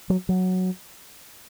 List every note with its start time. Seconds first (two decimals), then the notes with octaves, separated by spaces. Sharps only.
0.10 F#3
0.29 F#3